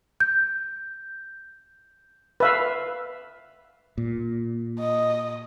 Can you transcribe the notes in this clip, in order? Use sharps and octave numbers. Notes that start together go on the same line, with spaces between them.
G6
B4 E5 F5
A#2
D#5